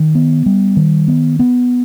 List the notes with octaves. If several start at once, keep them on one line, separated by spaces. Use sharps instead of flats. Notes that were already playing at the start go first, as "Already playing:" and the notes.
Already playing: D#3
B3
G3
D#3
B3
B3